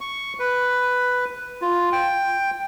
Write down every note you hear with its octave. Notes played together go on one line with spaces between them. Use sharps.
C#6
B4
F4
G5